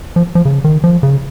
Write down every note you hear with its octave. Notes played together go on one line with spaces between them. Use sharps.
F3
F3
C#3
D#3
F3
C#3